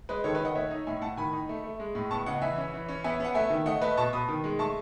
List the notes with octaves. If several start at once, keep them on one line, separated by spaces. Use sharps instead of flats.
G#3 B4 D#5
D#3 A4 C#5
B4 D#5
D#3
D#5 F#5
A3 C#5 E5
D#4
A2 E5 G#5
A2 F#5 A5
D#3 G#5 B5
D#4
A3
A3
G#3
A2
B3 A5 C#6
C#3 D#5 F#5
E3 E5 G#5
C#4
E3
C#4
B3 E5 G#5
B3 F#5
A3 E5 G#5
D#3
A3 D#5 F#5
A3 B4 D#5
B2 A5 C#6
B2 B5 D#6
D#3
G#3
A3 A5 C#6